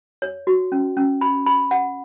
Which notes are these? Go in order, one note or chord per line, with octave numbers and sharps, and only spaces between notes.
C#5
F#4
C#4
C#4
B5
B5
F#5